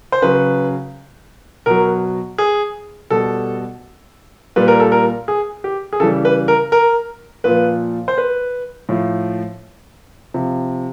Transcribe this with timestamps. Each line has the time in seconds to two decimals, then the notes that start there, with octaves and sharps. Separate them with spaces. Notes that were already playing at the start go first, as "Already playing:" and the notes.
0.12 C5
0.22 C#3 F#3 B4
1.66 B2 F#3 A#4
2.38 G#4
3.10 B2 G3 A4
4.56 A#2 G3 B4
4.68 A#4
4.80 A4
4.92 A#4
5.28 G#4
5.64 G4
5.93 G#4
6.00 C#3 E3 G3 A4
6.25 B4
6.48 A#4
6.72 A#4
7.44 A#2 F3 B4
8.08 C5
8.18 B4
8.89 A2 F3
10.34 C3 F3